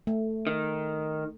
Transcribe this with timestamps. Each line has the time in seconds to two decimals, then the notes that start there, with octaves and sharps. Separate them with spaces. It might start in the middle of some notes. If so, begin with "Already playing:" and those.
0.07 A3
0.47 D#3